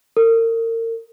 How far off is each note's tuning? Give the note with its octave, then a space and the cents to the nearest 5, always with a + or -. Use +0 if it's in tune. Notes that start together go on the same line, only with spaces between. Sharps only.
A#4 -35